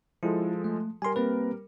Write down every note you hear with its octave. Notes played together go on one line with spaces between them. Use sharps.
F3 G#3 E4 A4
A3
G3 A#4 G#5 C6
A#3 C4 B4